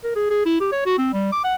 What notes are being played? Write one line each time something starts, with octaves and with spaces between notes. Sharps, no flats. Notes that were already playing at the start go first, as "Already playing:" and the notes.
A#4
G#4
G#4
E4
G4
C#5
F#4
C4
G3
D6
F#5